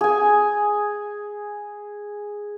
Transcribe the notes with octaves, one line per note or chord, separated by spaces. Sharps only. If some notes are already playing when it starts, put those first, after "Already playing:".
G#4 G#5